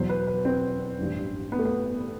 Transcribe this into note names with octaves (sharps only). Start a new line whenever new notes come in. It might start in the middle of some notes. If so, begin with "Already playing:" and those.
Already playing: E2 B2 F#3 C5
B4
B4
C4
A1 G2 E3
B3
A3
B3